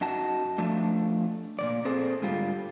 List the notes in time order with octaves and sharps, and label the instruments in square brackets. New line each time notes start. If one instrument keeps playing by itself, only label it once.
[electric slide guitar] F#2 D#4 F#4 A5
F3 A3 D4
A#2 C#3 D5
C4 G#4 A4 C5
G#2 D3 G3 F4